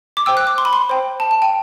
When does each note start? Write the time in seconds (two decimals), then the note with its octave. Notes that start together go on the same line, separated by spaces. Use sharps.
0.17 D6
0.26 C5 G5 E6
0.37 F#6
0.47 D6
0.58 C6
0.65 B5
0.73 C6
0.89 C5 G5
1.20 A5
1.31 A5
1.42 G5